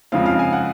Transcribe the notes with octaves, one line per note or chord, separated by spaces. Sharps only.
F2 C#3 F3 G#3 C4 F5
F5
G#5
F#5